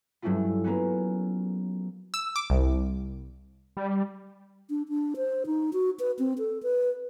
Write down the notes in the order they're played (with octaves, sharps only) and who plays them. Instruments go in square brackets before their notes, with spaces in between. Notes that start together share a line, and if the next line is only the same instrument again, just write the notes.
[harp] G2 F#3 A3 C#4 E4 F4
F#3 A#3 B3 C#4 F#4
[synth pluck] E6
D6
C2
[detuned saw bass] G3
[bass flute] D4
D4
C5
D#4
F#4
B4
C4
A4
B4